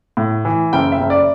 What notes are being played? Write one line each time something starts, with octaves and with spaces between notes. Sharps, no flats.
A2
E3
F#1 G5
E5
F#1
D5